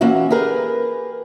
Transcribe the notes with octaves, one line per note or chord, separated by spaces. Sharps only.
E3 A#3 C#4 F#4 E5
G4 G#4 A#4 B4